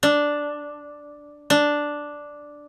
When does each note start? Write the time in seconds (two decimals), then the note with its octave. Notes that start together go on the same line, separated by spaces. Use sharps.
0.03 D4
1.50 D4